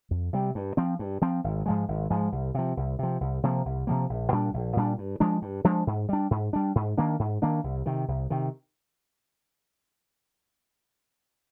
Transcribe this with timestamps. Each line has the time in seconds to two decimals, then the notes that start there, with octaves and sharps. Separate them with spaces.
0.11 F2
0.33 C3 G3
0.55 G2
0.77 F3 C4
0.99 G2
1.22 F3 C4
1.44 G#1
1.66 G#2 F3 G#3
1.88 G#1
2.10 G#2 F3 G#3
2.32 C2
2.55 C3 F3
2.77 C2
2.99 C3 F3
3.21 C2
3.43 C3 F3 A#3
3.65 C2
3.87 C3 F3 A#3
4.10 A#1
4.32 A#2 G3 D4
4.54 A#1
4.76 A#2 G3 D4
4.98 G2
5.20 F3 G#3 D4
5.42 G2
5.64 F3 G#3 D4
5.87 G#2
6.09 G3 D4
6.31 G#2
6.53 G3 D4
6.75 G#2
6.98 D#3 A#3 D4
7.19 G#2
7.42 D#3 A#3 D4
7.64 C2
7.86 C3 D#3
8.08 C2
8.30 C3 D#3